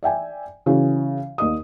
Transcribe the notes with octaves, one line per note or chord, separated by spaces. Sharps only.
D5 E5 G5 G#5
C#3 E3 C#4 F#4
D#2 D#5 D#6